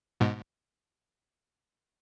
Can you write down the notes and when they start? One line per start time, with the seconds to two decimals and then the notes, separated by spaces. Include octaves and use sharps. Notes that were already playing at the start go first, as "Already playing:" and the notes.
0.20 G#2 B2